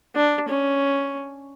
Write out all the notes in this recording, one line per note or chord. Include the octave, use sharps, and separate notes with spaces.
D4
C#4